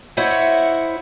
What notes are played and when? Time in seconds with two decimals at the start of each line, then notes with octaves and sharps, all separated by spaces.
0.17 E4 C5 C#5 D#5 E5 F#5